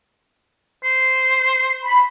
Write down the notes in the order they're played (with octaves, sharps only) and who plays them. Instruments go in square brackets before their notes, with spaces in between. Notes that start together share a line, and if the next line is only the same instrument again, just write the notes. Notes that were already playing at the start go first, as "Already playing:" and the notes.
[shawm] C5
[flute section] B5